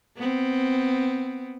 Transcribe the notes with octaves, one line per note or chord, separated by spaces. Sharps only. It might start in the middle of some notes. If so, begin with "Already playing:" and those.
B3 C4